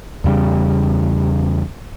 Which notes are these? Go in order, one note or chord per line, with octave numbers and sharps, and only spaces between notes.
E2 C#3 G3